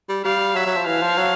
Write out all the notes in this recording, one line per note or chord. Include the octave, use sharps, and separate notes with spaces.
G3
G3 F5
F#3 E5
F#3
F3
E3 F5
F3
F#3